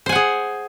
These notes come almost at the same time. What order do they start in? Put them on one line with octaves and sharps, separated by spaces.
C5 G#5 F#5 G#4